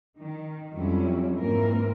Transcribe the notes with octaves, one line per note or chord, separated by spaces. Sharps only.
D#3
F2 F#3 G3 C#4 E4
G#2 E3 A#3 C4 A#4